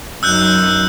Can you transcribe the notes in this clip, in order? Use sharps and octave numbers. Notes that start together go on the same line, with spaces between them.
F#2 D#4 E6 F#6 G6